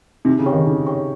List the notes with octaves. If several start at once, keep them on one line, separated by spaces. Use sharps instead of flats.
C3 D#4
C#3
G4 C#5 G5 C#6
D#3
C#3 D#4
G4 C#5 G5 C#6